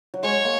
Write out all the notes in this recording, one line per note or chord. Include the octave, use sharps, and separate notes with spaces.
F#3
G#3 C#5
A#3